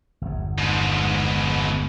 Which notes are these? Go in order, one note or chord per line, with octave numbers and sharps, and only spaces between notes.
G1 E2
G#2 B2